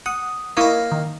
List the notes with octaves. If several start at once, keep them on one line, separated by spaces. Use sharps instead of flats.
F#5 D#6
A#3 E4 A#4 C#5 D#5
D#3